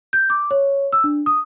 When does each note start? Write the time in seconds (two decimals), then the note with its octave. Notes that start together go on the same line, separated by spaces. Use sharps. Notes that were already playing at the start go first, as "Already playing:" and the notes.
0.13 G6
0.30 D6
0.51 C#5
0.93 E6
1.04 D4
1.26 D#6